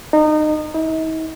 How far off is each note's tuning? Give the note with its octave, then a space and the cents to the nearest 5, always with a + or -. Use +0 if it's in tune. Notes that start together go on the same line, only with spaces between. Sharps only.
D#4 -25
D#4 +45